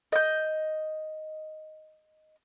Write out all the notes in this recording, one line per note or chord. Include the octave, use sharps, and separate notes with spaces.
D#5 G6